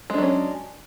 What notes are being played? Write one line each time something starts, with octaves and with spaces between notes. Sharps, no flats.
F#3 G#3 C#4 D4